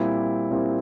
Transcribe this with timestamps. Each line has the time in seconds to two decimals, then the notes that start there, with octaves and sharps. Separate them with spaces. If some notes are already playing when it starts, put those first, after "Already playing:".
Already playing: A#2 G3 C4 E4
0.51 A#2 G3 C4 E4